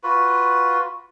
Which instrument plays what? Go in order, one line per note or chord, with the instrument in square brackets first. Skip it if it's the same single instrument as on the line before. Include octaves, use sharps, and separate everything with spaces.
[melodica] F4 F#4 B4